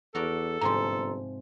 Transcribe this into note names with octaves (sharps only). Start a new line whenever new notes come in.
E2 F#4 A4 A#4 D5
G1 G#2 C3 F3 A#5 C6